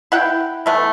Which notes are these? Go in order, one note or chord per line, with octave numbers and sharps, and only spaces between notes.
E4 F#5 G5
E3 A3 B3